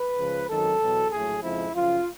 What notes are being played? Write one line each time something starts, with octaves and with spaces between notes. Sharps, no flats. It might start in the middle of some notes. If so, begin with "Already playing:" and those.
Already playing: B4
C#2 C#3 F3
G#1 F#2 D#3 F#3 A4
E2 B2 F#3
A#1 A2 F#3 A3 G#4
F2 C#3 F3 G#3 C4 E4
F#2 C#3 F3 F4